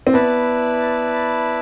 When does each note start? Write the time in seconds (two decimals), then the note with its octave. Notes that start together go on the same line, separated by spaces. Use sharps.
0.07 C4
0.13 B3 E4 B4 D5 A5